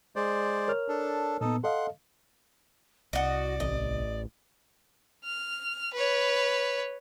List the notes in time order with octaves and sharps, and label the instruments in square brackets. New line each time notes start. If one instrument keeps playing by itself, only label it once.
[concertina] G#3 C5 D5
[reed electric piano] A#4 C#5 F6
[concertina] D4 A4
[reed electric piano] A#2 B3 [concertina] D#4 A4
[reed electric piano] A4 D#5 F5 [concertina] F#5 C6
[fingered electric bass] C2 [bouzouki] F#4 D#5 [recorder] D5
[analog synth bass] A1 [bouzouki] D#5
[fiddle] F6
B4 C#5